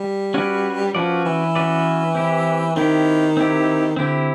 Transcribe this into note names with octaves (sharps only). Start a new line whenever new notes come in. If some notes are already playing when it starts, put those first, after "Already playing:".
Already playing: G3
C#4 F#4 B4 D5
F3 C#4 F#4 B4 D5
E3
C#4 F#4 B4 D5
C4 E4 G4
D#3 C4 E4 G4
C4 E4 G4
D3 C4 E4 G4